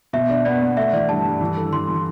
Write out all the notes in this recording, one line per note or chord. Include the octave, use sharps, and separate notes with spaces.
B2 E5
D4
B3 D5
B3
A3 E5
E3 D5
G2 A5
G2
E3
A4
E3 C6
E3